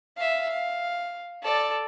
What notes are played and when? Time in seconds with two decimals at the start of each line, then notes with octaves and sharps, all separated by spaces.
0.17 E5 F5
0.49 F5
1.43 A4 D5